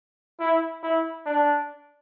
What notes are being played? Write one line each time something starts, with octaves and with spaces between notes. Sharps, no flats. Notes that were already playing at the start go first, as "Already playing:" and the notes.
E4
E4
D4